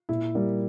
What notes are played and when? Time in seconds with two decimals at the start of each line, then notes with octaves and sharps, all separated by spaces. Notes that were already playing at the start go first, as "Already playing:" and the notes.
0.09 A#2 E4
0.35 G3 A#3